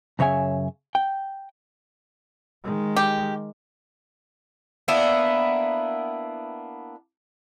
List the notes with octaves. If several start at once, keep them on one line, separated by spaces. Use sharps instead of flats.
F#2 C#3 C#5 E5 G#5
G5
D#3 G#3
G4
A#3 B3 D4 E4